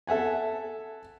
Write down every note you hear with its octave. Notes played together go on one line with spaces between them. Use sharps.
A4 E5 F#5 G#5